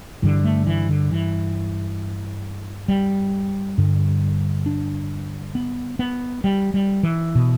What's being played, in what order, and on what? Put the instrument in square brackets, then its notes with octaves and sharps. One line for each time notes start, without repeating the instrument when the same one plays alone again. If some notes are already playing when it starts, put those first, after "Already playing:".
[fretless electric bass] G2 D3 E3
A3
E3
D3
E3
G3
G2 D3
D4
B3
B3
G3
G3
E3
B2